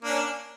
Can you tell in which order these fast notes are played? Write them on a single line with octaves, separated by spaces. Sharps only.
A#3 D4 C#4